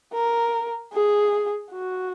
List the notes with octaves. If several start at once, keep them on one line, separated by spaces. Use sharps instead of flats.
A#4
G#4
F#4